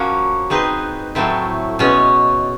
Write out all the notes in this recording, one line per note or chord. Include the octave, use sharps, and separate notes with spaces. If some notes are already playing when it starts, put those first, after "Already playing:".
Already playing: F3 A#3 C#4 F#4
G#3 C4 D#4 G#4 B4
A2 F#3 A3 C4 E4
B2 G#3 C#4